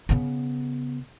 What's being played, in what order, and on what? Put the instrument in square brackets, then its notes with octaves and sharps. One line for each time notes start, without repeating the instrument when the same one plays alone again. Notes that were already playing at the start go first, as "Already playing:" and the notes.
[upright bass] C#3 B3